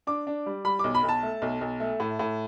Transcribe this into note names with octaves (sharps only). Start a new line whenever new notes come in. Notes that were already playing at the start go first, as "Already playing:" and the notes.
D4 D6
D4
G3
G3 B5
B1 D6
B5
B1
A5
A3
B1
B1
A3
A2
A2